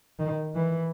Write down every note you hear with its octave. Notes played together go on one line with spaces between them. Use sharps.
D#3
E3